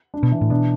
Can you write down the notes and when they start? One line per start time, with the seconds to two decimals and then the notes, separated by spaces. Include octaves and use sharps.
0.14 D4
0.23 B2
0.32 E3
0.41 A2
0.50 B2 D4